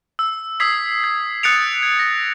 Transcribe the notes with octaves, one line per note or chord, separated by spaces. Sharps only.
E6
D#6 E6 G#6 B6 C7
G#6
D#6 F#6 A6 C#7 D7 F7
G#6
A#6